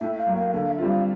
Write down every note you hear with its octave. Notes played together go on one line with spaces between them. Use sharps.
A2 E5
F5
F#3
A#3 F5
D3 F5
E5
G3 C4 F4
F5